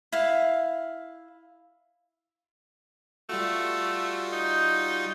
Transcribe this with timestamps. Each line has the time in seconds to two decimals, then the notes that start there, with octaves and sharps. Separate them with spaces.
0.12 E4 F5
3.29 G3 A3 F4 F#4
4.33 D#4